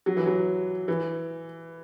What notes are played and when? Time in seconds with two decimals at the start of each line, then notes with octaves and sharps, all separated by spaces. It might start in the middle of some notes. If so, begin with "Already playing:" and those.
0.06 F#3
0.17 E3
0.26 F#3
0.88 E3